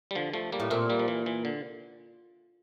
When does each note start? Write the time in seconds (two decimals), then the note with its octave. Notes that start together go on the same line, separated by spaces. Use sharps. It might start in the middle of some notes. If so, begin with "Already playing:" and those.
0.11 G3
0.15 D3 F3
0.33 F3 A3
0.52 G3 A#3
0.60 A2
0.70 A#2 A3 C4
0.89 G3 A#3
0.99 F3
1.08 E3
1.26 E3
1.45 D3